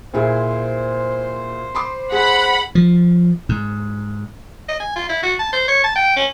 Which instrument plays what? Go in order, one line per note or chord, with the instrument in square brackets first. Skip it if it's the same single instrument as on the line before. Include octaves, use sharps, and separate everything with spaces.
[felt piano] A#2 E4 G#4 [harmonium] C5
[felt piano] B5 C6 D6
[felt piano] G#4 [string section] F#5 B5
[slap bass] F3
G#2
[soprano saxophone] D#5
G#5
F4
E4
F#4
A5
C5
C#5
A5
G5
C#4